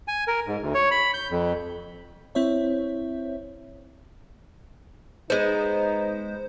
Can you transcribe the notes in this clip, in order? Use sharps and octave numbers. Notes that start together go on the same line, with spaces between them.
G#5
A#4
G#2
D2
C#5
B5
G6
F2
C4 E4 C5 C#5 E5
G#3 B3 D#4 C5